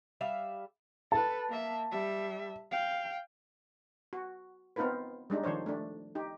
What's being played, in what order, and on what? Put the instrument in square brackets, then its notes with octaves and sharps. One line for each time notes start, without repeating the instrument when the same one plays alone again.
[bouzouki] G3 E5 F5
[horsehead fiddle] A4 B4 [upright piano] A5
[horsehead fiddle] A#3 E5
G3 E5
F5 G5
[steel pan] F#4
B3 C4 D#4 F4 A#4 B4
G3 G#3 D4 D#4
D#3 F3 D4 C5 C#5
A3 D4
D#4 G4